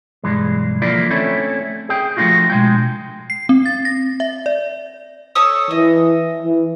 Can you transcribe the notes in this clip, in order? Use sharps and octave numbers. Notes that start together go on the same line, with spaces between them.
B1 G2 E3 G#3
D3 E3 F3 A#3 E4 D5
A3 C4 C#4 E4 A4
G#4 G5
F3 A3 A#3 D4 F4 F#4
B2 G#3 G5
C7
C4
A6
A#6
E5
D5
A4 C#5 D#6
E3 D#5
E3